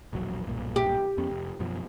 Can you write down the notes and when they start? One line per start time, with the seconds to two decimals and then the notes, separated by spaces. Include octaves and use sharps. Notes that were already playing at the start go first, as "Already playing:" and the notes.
0.13 E1 A#1 F#3
0.47 B1 G2 A#2
0.76 G4
1.18 F2 B3 C#4
1.30 F1
1.60 F#2 B2 F3